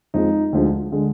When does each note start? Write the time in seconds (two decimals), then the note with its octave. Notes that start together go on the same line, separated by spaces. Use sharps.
0.14 F2 F3 G#3 D#4
0.52 D2 D3 F3 G#3
0.92 D3 G#3